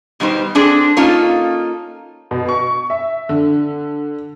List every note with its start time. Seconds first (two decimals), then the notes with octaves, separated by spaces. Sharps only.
0.20 B2 G3 D#4 C5
0.55 C4 D4 G#4 A4
0.97 A#3 C#4 D#4 F4 A4
2.31 B2
2.49 C#6
2.90 E5
3.29 D3